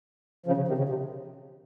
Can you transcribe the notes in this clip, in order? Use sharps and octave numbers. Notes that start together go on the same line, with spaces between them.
C#3 F3
C#3
C3 D#3
C#3
C3